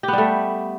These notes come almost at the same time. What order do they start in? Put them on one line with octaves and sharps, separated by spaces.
G4 B3 G3 A3